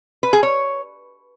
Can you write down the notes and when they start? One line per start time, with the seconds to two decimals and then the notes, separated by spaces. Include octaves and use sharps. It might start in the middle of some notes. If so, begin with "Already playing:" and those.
0.23 B4
0.33 G#4
0.43 C#5